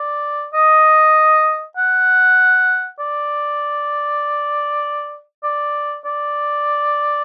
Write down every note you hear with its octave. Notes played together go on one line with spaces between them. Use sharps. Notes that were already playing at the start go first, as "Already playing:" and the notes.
Already playing: D5
D#5
F#5
D5
D5
D5